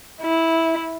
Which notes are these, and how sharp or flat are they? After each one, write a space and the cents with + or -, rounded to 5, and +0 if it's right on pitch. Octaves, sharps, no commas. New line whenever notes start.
E4 -10